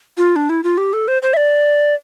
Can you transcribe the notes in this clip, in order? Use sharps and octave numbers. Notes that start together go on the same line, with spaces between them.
F4
D4
E4
F4
G4
A4
C5
C5
E5
D5